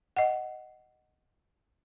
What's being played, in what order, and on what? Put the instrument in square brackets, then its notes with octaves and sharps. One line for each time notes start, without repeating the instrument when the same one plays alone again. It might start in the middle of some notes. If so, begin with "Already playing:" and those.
[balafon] D#5 F#5